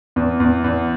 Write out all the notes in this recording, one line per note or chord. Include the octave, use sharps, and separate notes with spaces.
E2
E2
E2